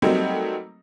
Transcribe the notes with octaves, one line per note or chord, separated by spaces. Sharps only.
F#3 G3 A3 A#3 C4 D#4